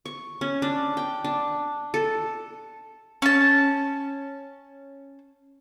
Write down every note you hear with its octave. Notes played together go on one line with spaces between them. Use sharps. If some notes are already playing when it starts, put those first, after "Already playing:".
C#6
C#4
D4
G5
D4
A4
C#4 A5